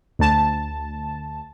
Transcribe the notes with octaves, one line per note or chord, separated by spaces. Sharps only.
D2 A5